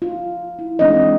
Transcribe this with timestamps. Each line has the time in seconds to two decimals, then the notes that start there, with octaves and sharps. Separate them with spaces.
0.02 F4
0.59 E4
0.79 E3 G#3 C4 D4 D#4 D#5